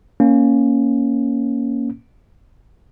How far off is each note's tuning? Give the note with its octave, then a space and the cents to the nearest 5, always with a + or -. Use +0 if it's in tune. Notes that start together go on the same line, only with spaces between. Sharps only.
A#3 +5 C#4 +0